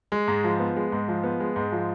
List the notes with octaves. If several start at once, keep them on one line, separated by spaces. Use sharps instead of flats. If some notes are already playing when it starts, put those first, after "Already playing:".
G#3
G#2
F3
B3
G#3
G#2
F3
B3
G#3
G#2
F3